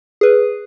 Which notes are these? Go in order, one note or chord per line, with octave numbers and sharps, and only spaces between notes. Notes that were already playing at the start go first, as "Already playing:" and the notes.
G#4 B4